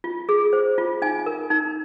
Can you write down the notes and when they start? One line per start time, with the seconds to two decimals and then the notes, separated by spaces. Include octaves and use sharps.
0.04 F4
0.29 G#4
0.53 C5
0.78 F4
1.02 D#4 G#5
1.26 A#4
1.50 D#4